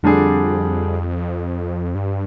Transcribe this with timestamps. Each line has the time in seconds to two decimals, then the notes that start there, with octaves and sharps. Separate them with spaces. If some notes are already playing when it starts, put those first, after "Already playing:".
0.03 F2 D3 G3 D4 G#4
1.95 G2